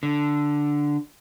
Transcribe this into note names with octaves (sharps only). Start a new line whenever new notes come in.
D3